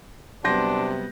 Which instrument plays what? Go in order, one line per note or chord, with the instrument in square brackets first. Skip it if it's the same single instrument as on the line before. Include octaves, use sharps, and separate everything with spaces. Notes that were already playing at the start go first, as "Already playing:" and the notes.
[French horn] C3 [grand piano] F#3 G3 B3 [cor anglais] D4 [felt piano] C6 G6 A#6